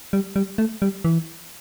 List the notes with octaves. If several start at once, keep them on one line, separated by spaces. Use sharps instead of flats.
G3
G3
A3
G3
E3